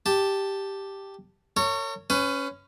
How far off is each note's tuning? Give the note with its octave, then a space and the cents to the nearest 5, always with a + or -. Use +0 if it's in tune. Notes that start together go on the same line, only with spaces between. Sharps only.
G4 +0 A5 +0
A#4 -45 C#5 +0
C#4 +0 B4 +30